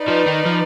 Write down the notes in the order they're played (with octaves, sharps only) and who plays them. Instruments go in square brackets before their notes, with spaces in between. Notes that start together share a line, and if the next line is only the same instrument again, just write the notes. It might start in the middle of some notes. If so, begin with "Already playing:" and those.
Already playing: [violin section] D#4 B4 D5
[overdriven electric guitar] F3
D#3
F3